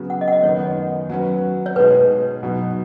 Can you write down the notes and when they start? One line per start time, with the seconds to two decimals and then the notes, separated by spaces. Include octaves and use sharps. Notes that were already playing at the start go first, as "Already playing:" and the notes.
Already playing: C#3 F#3 B3 F#4
0.10 F#5
0.21 D#5
0.28 F#5
0.33 D#5
0.43 F#2 D#3 B3 D#4 C#5
1.10 F#3 C#4 F#4 B4
1.66 C#5
1.76 B2 G#3 D#4 G#4 B4
2.43 B2 F#3 B3 D#4